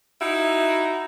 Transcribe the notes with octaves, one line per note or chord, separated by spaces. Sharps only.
D#4 E4 F#4